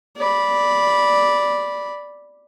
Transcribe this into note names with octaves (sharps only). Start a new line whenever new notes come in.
D5 B5